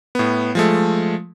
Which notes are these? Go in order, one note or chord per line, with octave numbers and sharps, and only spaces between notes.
A2 B3
F3 G#3 A3